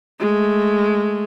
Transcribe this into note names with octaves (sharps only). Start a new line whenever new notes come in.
G#3 A3